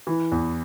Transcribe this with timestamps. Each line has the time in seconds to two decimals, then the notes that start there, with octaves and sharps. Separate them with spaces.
0.07 E3
0.32 E2